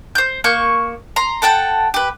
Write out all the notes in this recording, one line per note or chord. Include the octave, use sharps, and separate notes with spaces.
C5 G6
A#3 C#6 G6
A#5 C6
A4 F#5 G5 A5
G4 B4